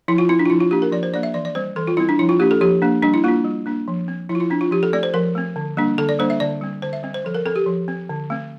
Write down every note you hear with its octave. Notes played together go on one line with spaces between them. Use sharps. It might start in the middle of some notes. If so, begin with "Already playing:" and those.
F3 E4
F4
C4 E4
D4
F4
F3 E4
F4
A#3 D4 G4
A#4
F3 D5
C5
A#3 D4 D5
E5
E3 D5
D5
G3 C4 C5
E3 A4
F4
G3 C4 E4
D4
F3 E4
F4
A#3 D4 G4
A4
F3 G4
A#3 D4
G3 D4
E4
A#3 D4 F4
G3
A#3 D4
F3
C4
F3 E4
F4
E4
C4 D4
F4
F3 G4
A4
A3 C4 D5
C5
F3 A#4
A3 C4
D3
G3 A#3 D4
D3 A4
D5
G3 A#3 D4 C5
E5
D3 D5
G3 C4
D3 C5
E5
G3 C4
C5
F3 A4
A#4
C4 A4
G4
F3
C4
D3
A3 C4